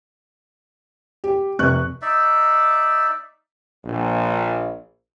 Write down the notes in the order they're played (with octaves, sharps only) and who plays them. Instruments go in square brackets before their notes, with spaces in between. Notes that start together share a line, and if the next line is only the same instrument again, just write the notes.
[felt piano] G4
F1 C3 C#6 F#6
[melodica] D#4 D5 E5
[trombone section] A#1